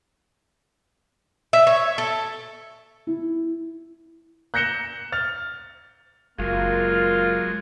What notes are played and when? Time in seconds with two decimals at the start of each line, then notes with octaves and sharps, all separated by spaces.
1.53 E5
1.67 C#5
1.98 A4
3.07 E4
4.54 F#6 G6 A#6 C#7 E7 G7
5.12 F6 A6 F7
6.38 F#1 F#3 G#3 A#3 F4